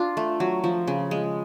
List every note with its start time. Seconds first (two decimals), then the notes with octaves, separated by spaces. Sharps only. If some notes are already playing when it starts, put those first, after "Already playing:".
Already playing: D4 F4
0.17 A3
0.40 F#3
0.64 F3
0.87 C#3
1.11 G#3